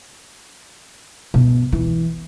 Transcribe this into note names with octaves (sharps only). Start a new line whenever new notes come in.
B2
E3